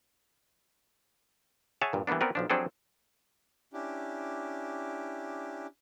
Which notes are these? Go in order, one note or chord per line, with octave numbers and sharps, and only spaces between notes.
G#4 C#5 E5 F#5 G#5 A5
G2 A#2
E3 G3 A#3 B3 D4
B3 C4 A#4 B4 D5
B1 F3 D4
F3 F#3 C4 D4 G#4 A4
C#4 D4 E4 G4